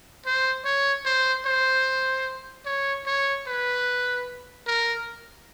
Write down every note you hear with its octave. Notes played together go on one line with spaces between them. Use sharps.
C5
C#5
C5
C5
C#5
C#5
B4
A#4